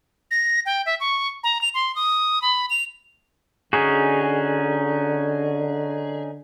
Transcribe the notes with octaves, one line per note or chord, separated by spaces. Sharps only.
A#6
G5
E5
C#6
A#5
F7
C6
D#6
B5
F7
D3 C#4 D#4 F#4 G#4